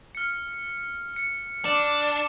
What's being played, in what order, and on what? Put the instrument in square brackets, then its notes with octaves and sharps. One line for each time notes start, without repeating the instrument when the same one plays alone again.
[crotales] F6 C#7
C#7
[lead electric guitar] D4 [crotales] D6 E7